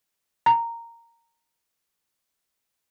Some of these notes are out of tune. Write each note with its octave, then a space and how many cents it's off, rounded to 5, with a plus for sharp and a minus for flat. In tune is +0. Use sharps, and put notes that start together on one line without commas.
A#5 -10